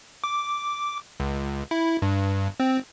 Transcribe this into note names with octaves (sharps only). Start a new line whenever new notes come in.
D6
C#2
E4
G2
C4